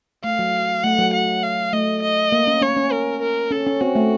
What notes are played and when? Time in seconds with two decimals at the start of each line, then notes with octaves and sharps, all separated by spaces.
0.24 A3 F5
0.39 F#3
0.83 A3 F#5
0.99 F#3
1.13 F#5
1.43 F5
1.73 A3 D#5
2.02 D#5
2.32 A#3
2.47 C#4
2.62 C#4 C#5
2.76 C#4
2.92 A#4
3.22 A#4
3.51 C#4 A4
3.67 C#4
3.81 C4 F#4
3.95 A3